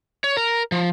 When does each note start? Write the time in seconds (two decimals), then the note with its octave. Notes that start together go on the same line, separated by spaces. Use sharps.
0.24 C#5
0.37 A#4
0.72 F3